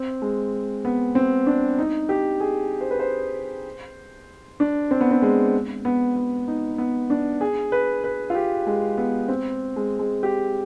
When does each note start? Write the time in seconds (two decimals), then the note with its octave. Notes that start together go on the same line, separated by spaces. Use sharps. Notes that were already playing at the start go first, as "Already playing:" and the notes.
Already playing: C4
0.22 G#3
0.85 B3
1.15 C4
1.47 D4
1.79 D#4
2.09 G4
2.40 G#4
2.81 C5
2.91 B4
3.00 C5
4.60 D4
4.91 C4
5.01 B3
5.11 C4
5.22 G#3
5.85 B3
6.16 B3
6.48 D#4
6.78 B3
7.10 D4
7.41 G#4
7.72 B4
8.04 B4
8.30 F4
8.35 G4
8.67 G#3
8.98 B3
9.28 C4
9.76 G#3
9.99 G#3
10.23 G4